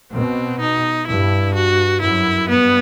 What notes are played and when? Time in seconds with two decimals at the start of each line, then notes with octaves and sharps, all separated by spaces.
0.12 B2 C4
0.60 D#4
1.07 G2 E4
1.55 F#4
2.02 F#2 E4
2.49 G2 B3